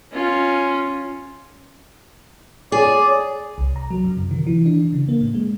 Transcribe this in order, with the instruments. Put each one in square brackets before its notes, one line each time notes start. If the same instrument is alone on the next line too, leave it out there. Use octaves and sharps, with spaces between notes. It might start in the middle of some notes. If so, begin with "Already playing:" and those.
[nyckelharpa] C#4 F4
[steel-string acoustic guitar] G#4 [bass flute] C#5 [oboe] D5
[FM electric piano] C2
A#5
F#3
F#2
C3
D#3
E3
D4
C#3
A#3
A2
G#3